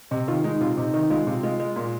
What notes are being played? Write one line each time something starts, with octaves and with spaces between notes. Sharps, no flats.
C3 D#5
D#3 F4
G#3 D#4
C3 F4
C3 D#4
D#3 D#4
G#3 F4
C3 F4
G#3 F4
G#3
A#2